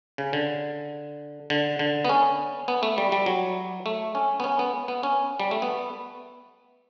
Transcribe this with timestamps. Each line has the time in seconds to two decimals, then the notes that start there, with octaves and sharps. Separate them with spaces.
0.18 C#3
0.33 D3
1.50 D3
1.79 D3
2.05 B3
2.09 C#4
2.68 B3
2.83 A3
2.98 G3
3.12 G3
3.26 F#3
3.86 A3
4.15 C#4
4.40 B3
4.44 C#4
4.59 B3
4.88 B3
5.03 C#4
5.40 G3
5.51 A3
5.62 B3